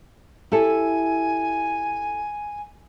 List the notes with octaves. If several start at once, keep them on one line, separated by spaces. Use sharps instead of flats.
E4 G4 A4 G#5